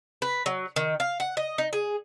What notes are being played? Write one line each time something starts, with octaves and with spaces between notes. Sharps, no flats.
B4
F#3
D#3
F5
F#5
D#5
D#4
G#4